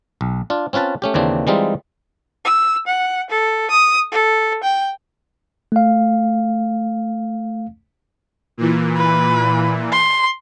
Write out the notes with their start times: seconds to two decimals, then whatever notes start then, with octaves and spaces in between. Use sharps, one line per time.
0.21 B1
0.50 D4 F4
0.73 C4 C#4 F4 B4 A5
1.02 A3 C#4 G4
1.14 D#2 C#3 E3 A#3 C4 D4
1.47 E3 G3 G#3 C4 D#4 F4
2.45 E6
2.87 F#5
3.30 A4
3.71 D#6
4.12 A4
4.64 G5
5.72 A3 F5
8.57 A#2 E3
8.97 B4
9.92 C6